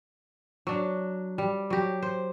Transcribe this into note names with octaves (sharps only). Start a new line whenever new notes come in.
F#3 D4
G3
F#3 G4
C5